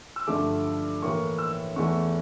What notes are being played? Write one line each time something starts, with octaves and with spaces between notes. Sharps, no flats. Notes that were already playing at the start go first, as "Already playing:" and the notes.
E6
G2 D3 F3 A3 D6
A2 E3 A#3 C#6
E6
E2 E3 A3 C#6